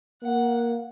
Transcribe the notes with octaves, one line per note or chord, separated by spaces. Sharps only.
A#3 F#5